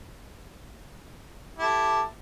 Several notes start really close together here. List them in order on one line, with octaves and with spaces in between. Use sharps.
G4 E4 A4